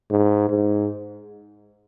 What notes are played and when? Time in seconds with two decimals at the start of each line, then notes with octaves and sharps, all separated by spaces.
0.11 G#2
0.49 G#2